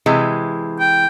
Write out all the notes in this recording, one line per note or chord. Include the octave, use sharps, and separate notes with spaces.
C3 E3 G#3
G5